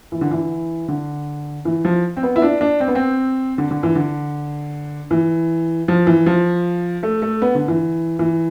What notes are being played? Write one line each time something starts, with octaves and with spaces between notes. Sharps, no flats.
E3
D3
E3
D3
E3
F3
C4
B3
E4
D4
D4
C4
B3
C4
D3
D3
E3
D3
E3
F3
E3
F3
A3
A3
B3
D3
E3
E3